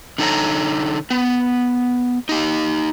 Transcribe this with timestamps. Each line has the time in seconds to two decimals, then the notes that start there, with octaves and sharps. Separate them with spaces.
0.18 D3 D#4 A4 C#5 A#5
1.10 B3
2.29 D#4 G4